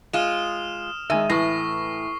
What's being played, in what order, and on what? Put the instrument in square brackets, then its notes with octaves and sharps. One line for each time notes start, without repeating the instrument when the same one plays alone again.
[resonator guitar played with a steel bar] G#3 F4 [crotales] D#6 F6 E7
[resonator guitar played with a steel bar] D#3 [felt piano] G#3 D#7 [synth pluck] E5 G#5
[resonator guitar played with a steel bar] A2 [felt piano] E3 A#6 [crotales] C#6 C7